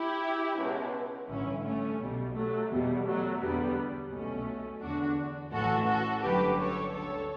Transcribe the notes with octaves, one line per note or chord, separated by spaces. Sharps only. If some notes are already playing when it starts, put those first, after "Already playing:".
Already playing: E4 G4
C#2 B2
A1 G2 D3 C#4 E4
A3 C#4
B1 B2 G3
F#3 A3
E2 B2 G3
F#3 A3
E2 D3 G3 B3
B1 B2 A3 C#4
E2 D3 D4 F#4
A1 A2 E3 F#4 A4
F#4 A4
G1 F#2 D3 G4 B4
A4 C#5
D2 D3 A4 C#5